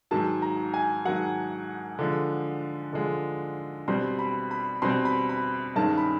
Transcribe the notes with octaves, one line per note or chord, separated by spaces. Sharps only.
G#2 D#3 F#3 A5
A#5
G#5
G#2 D#3 F#3 F#5
D3 F3 G#3
D3 F3 G#3
B2 G3 C4 C6
B5
B5
B2 G3 C4 C6
B5
B5
G2 D#3 G#3 C#4 A5
B5